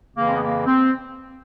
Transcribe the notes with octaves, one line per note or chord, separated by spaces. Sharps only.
F2 C#3 E3 A#3
C4
B3
A#3
C4